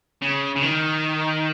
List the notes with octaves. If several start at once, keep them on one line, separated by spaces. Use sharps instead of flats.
C#3
C#3
D#3